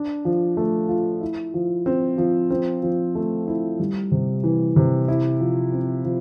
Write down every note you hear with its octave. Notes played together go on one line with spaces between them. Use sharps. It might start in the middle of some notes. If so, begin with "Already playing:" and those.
Already playing: D4
F3
A3
F4
E4
F3
C4
F3
C4
F3
A3
E4
G3
C3
E3
C3
E4
F3
C4
F3